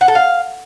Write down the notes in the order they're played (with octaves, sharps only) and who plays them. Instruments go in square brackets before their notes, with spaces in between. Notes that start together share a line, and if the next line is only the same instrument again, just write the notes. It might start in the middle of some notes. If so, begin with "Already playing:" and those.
[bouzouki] F#5
A4
F5